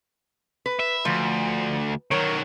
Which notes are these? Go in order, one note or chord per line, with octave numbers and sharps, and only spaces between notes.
B4
E5
D2 F3
D#3 F#3 A#4 C#5